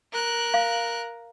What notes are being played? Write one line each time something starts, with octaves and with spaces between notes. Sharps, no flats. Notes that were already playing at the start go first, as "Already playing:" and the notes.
A#4 F#6
F5